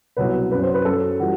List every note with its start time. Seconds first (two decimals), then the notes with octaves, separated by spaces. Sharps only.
0.17 C2 B2 F#3 B4
0.51 F#2 F#3 B4
0.63 C5
0.74 B4
0.85 F#2 F#3 A4
1.19 E3 G3 F#4